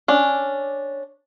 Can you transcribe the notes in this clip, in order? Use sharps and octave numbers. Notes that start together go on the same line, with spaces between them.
C#4 D4